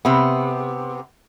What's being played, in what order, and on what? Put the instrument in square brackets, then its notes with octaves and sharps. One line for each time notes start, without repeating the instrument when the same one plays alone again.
[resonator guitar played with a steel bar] C3 B3